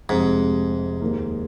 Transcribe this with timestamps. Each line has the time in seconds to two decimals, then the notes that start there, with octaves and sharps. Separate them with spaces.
0.09 F1 F2 G#2 C3 G#3
1.02 D#2 D#3 A#3